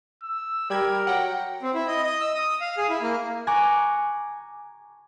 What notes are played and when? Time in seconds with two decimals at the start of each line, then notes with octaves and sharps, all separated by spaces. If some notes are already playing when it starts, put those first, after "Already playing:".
0.23 E6
0.70 G3 G4 A#4 B5 G#6
1.07 F#3 F#5 G5
1.63 C4
1.74 E4
1.88 D#5
2.04 D#5
2.21 E6
2.35 D#6
2.61 F5
2.78 G#4
2.89 E4
3.01 A#3
3.47 G#5 A#5 C#6 D6 F#6